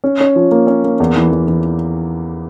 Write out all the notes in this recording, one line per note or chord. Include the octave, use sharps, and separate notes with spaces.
C#4
C#4
F3
A#3
C#4
A#3
E2
E3
E2
E3